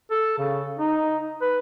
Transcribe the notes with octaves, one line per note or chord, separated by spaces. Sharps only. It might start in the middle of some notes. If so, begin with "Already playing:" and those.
A4
C#3
D#4
B4